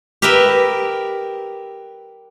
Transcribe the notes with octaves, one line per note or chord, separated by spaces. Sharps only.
G4 A#4 B4 D#5 E5